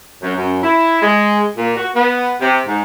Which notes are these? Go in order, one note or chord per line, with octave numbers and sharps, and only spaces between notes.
F#2
F#2
E4
G#3
A#2
F#4
B3
C3
G#2